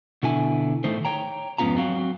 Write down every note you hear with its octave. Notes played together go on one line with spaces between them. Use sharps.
B2 D3 E4 G#5
A2 D#3 A3 D#4 C5
C#5 G5 A#5
F2 G#2 B3 C#4 F4 A#5
F#3 C4 F#4 F5